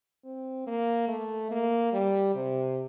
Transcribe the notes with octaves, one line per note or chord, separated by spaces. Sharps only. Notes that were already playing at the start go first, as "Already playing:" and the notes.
C4
A#3
A3
A#3
G3
C3